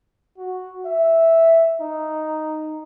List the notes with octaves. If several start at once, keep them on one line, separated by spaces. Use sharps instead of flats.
F#4
E5
D#4